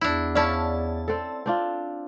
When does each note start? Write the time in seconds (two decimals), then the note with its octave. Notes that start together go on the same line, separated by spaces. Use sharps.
0.01 E2 D4 E4
0.35 C#4 E4 C#5 D5 F5 A5
1.08 C4 A4
1.46 C4 D4 F4